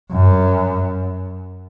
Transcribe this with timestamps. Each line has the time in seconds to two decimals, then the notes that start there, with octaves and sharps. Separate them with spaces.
0.12 F#2